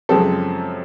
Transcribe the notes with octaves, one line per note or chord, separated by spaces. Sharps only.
F#2 C#3 F3 G#3 C4 G4 A4